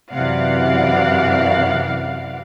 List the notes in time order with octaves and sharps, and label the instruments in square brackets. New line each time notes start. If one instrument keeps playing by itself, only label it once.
[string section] F#2 C3 E3 D5 F5 F#5